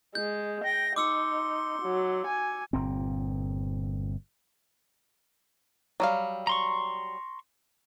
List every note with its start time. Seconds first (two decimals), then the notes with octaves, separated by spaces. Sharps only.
0.15 G#3 G6
0.64 G5 A#6
0.96 D#4 C6 D6 E6 C#7
1.82 F#3
2.27 G#5
2.73 G1 A#2 C4
6.00 F#3 G3 F5
6.47 A#5 C6 C#6